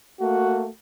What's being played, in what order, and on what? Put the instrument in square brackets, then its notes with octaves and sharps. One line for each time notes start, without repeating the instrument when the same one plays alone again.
[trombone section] A3 A#3 F#4